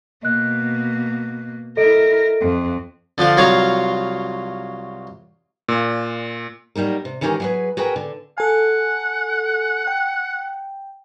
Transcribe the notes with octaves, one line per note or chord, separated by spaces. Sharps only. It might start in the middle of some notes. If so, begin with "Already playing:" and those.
B2 A#3 D#5 F#6
E4 A4 A#4 D#5 D7
F2
D3 F3 D4 F4
C2 F#3 F4 C#5 F5 A#5
A#2
F#3 G3 A#3 D#4 A#4
C3
D#3 E3 G#3 C#4 G4 A#4
F#3 G#4 B4
F#4 G#4 A#4 B4 G5
D3
A4 F#5 G#5
G5